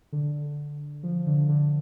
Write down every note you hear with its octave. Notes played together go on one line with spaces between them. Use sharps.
D3
F3
D3
D3